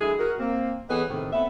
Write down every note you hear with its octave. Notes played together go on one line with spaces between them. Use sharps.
D3 F#3 G#3 E4 G#4
F#4 A#4
A#3 C4
E3 B3 C#4 G#4 A4 D#5
A2 C3 D#3
B3 C4 A4 E5